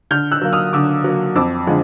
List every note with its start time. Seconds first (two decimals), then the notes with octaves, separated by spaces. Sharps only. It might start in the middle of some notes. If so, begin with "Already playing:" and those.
0.11 D3 F6 G6
0.32 E6 F#6
0.41 F#3 A#3
0.53 D#6 F6
0.73 D3 D6 E6
1.04 F#3 A#3
1.35 F2 D6 E6
1.67 D3 F3 G#3